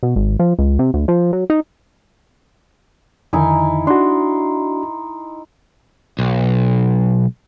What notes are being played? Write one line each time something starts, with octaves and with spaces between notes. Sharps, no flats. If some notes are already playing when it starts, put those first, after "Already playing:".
B2
G#1
F3
C#2
C3
D2
F3
F#3
D#4
F2 D3 D#3 D#4 E4 G#5
D4 F#4 C6
B1